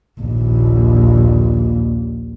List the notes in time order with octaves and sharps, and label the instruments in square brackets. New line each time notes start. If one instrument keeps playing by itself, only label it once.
[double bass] A#1 D#2